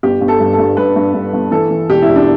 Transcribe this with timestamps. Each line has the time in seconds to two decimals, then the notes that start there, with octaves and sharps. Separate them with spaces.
0.03 G1 G4
0.21 G1
0.28 A4
0.40 G2
0.53 A4
0.59 G2
0.77 G2 B4
0.96 G2
1.14 G2
1.33 G1
1.51 E3 A4
1.71 E3
1.90 E1 G4
2.02 E4
2.08 E1
2.16 D4